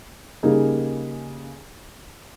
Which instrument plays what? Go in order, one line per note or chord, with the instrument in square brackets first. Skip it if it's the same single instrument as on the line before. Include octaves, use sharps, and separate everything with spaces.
[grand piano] C#3 G3 A#3 D#4 G#4